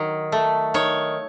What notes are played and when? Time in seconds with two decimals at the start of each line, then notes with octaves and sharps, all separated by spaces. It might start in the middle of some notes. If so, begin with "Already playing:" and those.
Already playing: D#3 F#3
0.32 A3
0.74 D#3 C#5